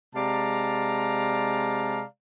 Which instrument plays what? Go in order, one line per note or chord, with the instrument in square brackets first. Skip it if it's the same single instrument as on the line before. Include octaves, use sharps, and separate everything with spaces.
[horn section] C3 G#3 D5 F5 A5 A#5